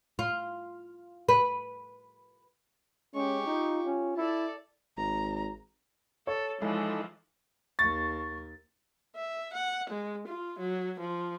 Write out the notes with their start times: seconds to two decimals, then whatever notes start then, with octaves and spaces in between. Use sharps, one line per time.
0.19 F4
1.29 B4
3.15 G#3 C#4 G4 C#6
3.46 D#4 F4
3.86 C#4
4.17 E4 A4 D5
4.97 G#1 A#5
6.27 A4 C#5
6.62 E3 F3 G#3 D#4 E4 A4
7.79 D#2 A#4 C#6 A6
9.15 E5
9.54 F#5
9.89 G#3
10.27 F4
10.58 F#3
10.98 F3